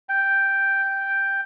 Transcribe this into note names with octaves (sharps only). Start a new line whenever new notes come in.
G5